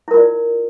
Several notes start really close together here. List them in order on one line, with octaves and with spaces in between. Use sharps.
E4 A#4 F4 D5